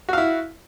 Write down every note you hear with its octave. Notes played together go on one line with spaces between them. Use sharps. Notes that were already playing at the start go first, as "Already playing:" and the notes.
E4 F#4 F5